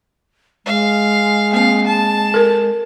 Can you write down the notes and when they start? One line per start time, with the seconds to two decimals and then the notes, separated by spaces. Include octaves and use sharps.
0.66 G#3 F5
1.53 A#3 C4 F5
1.86 A5
2.34 A4 A#4